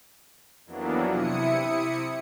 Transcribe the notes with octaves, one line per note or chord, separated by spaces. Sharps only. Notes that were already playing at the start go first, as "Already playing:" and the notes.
F2 E3 F#3 A#3 B3 D4
C3 E4 D#6 C#7